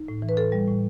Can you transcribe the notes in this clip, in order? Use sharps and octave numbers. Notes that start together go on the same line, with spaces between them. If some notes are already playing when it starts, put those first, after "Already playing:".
Already playing: D#4
A2
E3
B4
A2 A4
G3
A2